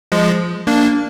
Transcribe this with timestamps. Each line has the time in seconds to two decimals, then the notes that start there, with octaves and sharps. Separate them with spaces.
0.12 F3 G#3
0.67 A#3 D4